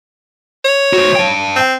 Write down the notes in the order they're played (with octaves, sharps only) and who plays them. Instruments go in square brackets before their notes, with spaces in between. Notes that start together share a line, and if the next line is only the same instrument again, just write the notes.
[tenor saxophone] C#5
[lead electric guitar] F#4 C5
G5 A5
[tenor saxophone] C4